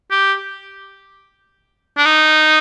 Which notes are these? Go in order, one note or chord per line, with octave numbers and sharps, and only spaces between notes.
G4
D4
D#4